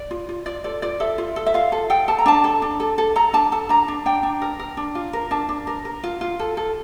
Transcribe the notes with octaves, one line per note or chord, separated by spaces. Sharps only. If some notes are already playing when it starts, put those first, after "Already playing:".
Already playing: D5
F4
F4
F4 D5
A4 D5
F4 D5
A4 E5
F4
A4
E5
F4 F5
A4
A4 G5
A4 A5
A#5
D4 A5
A4
D4
A4
A4
A4 A#5
D4 A5
A4 A5
D4 A#5
D4
D4 G5
D4
A#4
A#4
D4
F4
A#4
D4 A5
D4
A#4
A#4
F4
F4
A4
A4